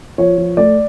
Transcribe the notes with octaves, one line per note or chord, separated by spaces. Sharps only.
F3 C#5
F3
A3 D5